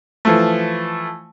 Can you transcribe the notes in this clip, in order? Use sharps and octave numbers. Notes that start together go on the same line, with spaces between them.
E3 F3 A3